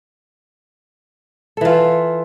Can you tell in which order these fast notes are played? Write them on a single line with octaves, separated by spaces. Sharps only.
A4 E3 F4